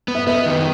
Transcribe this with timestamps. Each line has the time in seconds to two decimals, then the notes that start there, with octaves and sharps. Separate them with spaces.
0.08 B3
0.15 E5
0.27 B3 B4 D#5
0.46 D#3